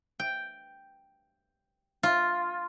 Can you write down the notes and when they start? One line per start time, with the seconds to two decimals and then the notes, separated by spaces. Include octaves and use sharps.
0.19 G5
2.03 F4